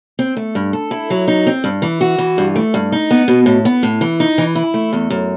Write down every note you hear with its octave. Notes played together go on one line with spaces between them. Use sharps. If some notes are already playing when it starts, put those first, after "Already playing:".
C4
A3
G2
A4
E4
F#3
D#4
C4
G2
E3
F#4
E3
G2
A3
G2
D#4
B3
B2
A2
B3
A2
E3
D#4
E3
E4
A3
E2
F#2